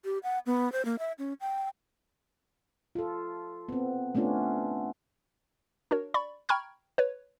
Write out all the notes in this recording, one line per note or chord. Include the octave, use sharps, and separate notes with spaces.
G4
F#5
B3
C5
A#3
E5
C#4
G5
F4 A4
B3 C4
A3 B3 C#4 D4 F4
D4 F#4 A#4 C#5
D5 B5 C#6
G5 A#5 B5 C#6 F6 G#6
B4 C#5